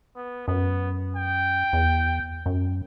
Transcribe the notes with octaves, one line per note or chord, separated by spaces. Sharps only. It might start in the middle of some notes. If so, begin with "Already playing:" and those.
B3
F#2 B3
G5
E2
F#2